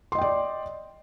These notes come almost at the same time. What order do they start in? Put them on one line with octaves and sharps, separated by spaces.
C6 D#5 G5 D5